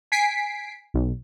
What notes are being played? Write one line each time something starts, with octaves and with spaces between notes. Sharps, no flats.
G#5 B6 C7 D7
B1